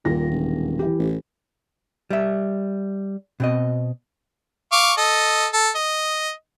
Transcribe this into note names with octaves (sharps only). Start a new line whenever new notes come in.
D#1 A#2 A#6
E1
E3 G4
A1
G3 E5
B2 C4 D#5
F5 C#6 D6
A4 D#5
A4
D#5